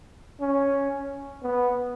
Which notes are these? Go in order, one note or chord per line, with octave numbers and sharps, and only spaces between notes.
C#4
B3